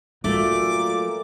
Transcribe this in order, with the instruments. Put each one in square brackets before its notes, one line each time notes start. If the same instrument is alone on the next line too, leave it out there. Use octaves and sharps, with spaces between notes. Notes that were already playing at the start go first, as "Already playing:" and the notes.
[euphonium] A#2 [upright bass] F#3 [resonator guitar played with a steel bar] A3 [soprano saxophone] D6